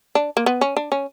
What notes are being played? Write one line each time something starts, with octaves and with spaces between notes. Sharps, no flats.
D4
A#3
B3
C#4
D4
C#4